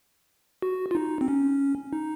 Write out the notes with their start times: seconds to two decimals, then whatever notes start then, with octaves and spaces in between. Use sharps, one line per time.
0.62 F#4
0.91 F4
0.95 D#4
1.21 C4
1.28 C#4
1.93 D#4